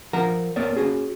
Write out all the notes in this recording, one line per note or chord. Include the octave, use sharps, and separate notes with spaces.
F3 A#4 F#5 A#5
B3 A#4 C#5 D5
C#4 F#4 G#4